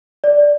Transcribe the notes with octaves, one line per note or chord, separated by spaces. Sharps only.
D5